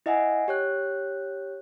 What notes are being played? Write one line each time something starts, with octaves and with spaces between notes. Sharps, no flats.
E4 D#5 E5 F#5 G#5
G4 C#5 F#6